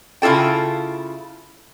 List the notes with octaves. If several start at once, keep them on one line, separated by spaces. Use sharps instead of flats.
C#3 E4 F4 A4 G5